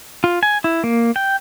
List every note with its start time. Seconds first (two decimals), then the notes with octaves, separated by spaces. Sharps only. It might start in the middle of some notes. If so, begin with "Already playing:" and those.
0.24 F4
0.43 G#5
0.64 E4
0.84 A#3
1.16 G5